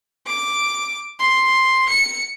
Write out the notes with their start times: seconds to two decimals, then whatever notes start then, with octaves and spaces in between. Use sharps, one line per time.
0.27 D6
1.19 C6
1.89 C#7